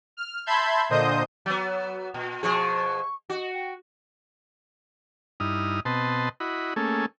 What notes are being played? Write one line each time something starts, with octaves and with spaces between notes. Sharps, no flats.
F6
E5 A5 B5 C6 G6 G#6
A#2 D3 C5 D#5 D#6 G6
F#3 B3
A#2
B2 F3 G#4 C#6
F#4 D#5
G5
G2 D#4 E4 D#6 F6
B2 C4 B4 D#5 A5 C6
E4 F#4 D#5 B5
A3 A#3 C#4 G#4 A4